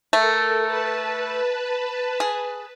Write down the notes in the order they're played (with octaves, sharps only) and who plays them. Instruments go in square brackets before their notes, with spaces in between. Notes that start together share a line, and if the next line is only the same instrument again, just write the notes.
[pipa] A3 [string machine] A4 A#4
[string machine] B4 A5
[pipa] G#4